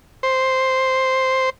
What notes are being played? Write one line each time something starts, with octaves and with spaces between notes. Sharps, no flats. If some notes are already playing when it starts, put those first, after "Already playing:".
C5